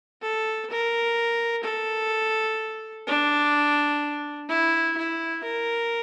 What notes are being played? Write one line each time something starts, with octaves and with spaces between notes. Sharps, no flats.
A4
A#4
A4
D4
E4
E4
A#4